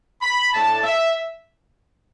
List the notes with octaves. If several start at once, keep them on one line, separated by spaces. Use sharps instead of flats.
B5
A2 A3 D4 A5
E5